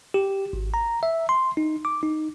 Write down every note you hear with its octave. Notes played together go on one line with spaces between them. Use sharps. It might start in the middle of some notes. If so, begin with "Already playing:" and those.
G4
G#1
A#5
E5
C6
D#4
D6
D#4